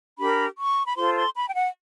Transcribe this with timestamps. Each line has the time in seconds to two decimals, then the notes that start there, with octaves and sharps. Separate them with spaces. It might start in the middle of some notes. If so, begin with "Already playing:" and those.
0.18 D4 G4 A#4 B5
0.58 C#6
0.85 B5
0.96 F4 A4 C5 C6
1.15 C6
1.35 B5
1.48 G5
1.54 F#5